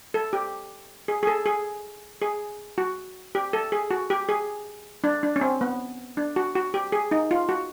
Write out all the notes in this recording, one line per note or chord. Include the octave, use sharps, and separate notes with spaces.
A4
G4
G#4
G#4
A4
G#4
G#4
F#4
G4
A4
G#4
F#4
G4
G#4
D4
D4
C#4
C4
B3
D4
F#4
F#4
G4
G#4
D#4
F4
F#4